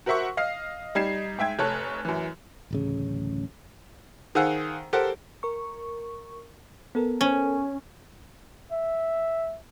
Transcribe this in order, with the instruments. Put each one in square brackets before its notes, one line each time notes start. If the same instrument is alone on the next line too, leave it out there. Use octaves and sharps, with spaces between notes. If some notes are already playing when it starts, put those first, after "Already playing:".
[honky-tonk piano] F#4 A#4 C5 E5 F#5 C#6
D#5 F5 F6 C7
G3 D#4 G#6 C7 E7
G#2 E5 G5 G#6
F1 A4 C#5 F#6
F#2 E3
[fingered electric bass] D1 A1 C#3
[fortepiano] D#3 G#4 C5 F5 F#5 E6
G4 A4 A#4 C5 F#5
[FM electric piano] A#4 C#6
B3 A4 A#4
[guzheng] C#4
[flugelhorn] E5